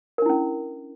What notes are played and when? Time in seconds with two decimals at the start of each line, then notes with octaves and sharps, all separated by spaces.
0.18 A#4
0.22 D4
0.26 E4
0.29 C#4